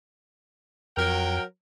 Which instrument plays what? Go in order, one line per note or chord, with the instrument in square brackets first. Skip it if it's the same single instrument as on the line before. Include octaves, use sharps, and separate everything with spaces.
[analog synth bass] F2 [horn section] F#3 A#4 G5